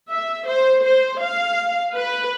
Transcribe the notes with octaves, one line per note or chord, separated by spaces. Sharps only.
E5
C5
C5
F5
B4